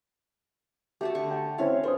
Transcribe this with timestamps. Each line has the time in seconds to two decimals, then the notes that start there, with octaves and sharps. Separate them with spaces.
1.01 A3 F#4 G4 A5
1.15 D3 C#6
1.30 G5
1.58 C4 C#4 E4 C#5 F5
1.83 D4 B4 C5 D#6